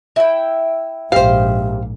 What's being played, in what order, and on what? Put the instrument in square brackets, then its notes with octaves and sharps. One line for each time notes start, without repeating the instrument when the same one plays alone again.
[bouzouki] E4 G5
[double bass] A#1 G#2 [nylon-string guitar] G4 C5 [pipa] F5